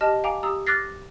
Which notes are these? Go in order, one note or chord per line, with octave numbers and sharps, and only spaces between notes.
G4 D#5 A5 F6
F5 G5 G#5 A#5 D6
G4 A#5 D#6 E6
D6 F6 F#6 A6 A#6 C7